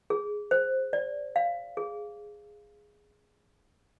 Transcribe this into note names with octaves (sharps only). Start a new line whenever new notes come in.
G#4
C5
D5
F5
G#4